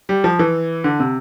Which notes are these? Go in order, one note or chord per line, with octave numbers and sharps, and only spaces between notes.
G3
F3
E3
D3
C3